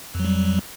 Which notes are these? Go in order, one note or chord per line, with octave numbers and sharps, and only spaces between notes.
F2 F#3 G3